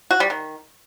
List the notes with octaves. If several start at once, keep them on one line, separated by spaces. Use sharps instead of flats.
F#4
G3
D#3